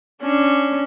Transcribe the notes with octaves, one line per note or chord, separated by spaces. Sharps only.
C#4 D4